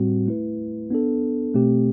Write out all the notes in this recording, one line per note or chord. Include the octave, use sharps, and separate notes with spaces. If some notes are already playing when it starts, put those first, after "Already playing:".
Already playing: A2 G3 C4 F#4
A3 E4 B4
B3 D4 A4
B2 A3 C4 G4